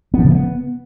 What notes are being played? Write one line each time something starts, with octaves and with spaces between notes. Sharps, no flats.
B3
F3
C#3
A3
B3